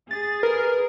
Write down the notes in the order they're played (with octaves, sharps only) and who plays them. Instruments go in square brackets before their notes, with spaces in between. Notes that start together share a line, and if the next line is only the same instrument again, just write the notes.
[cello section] G#4 [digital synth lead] A6
[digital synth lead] A#4 [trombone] B4